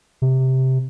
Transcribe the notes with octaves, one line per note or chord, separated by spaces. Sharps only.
C3